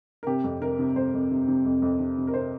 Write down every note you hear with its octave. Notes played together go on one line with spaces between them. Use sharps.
A#4
C3 G4
F2
C3 A#4
C3
F2 C5
F2
C3
C3
F2
F2
C3
C3
A#4
C3 C5